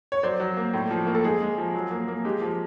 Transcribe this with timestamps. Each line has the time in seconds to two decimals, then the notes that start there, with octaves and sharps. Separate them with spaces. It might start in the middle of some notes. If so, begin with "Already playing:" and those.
0.12 C#5
0.23 F#3 C5 D5
0.40 F#3
0.57 A#3
0.74 A2
0.90 F3
1.07 A#3
1.15 A4
1.24 G#3 G#4
1.41 G#3
1.58 F3
1.75 F#3
1.91 A#3
2.08 A#3
2.25 G#3 G4
2.42 F3